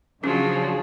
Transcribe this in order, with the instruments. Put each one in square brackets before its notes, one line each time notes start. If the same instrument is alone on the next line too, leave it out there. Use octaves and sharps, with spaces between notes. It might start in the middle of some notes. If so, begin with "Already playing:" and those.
[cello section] C#3 D4 G#4 [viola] F3 F#3 [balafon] C#4